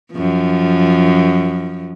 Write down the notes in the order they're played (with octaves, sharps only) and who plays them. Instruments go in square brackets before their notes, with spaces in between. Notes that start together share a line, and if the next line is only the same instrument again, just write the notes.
[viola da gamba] F#2 F3